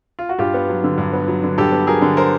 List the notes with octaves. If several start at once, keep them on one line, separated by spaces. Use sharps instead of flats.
F4
F#4
G2 F4 G4
B3
F#3
D3
G2
B3
F#3
D3
G2 G4 A4
B3
F#3 G#4 A#4
D3
A#4 C5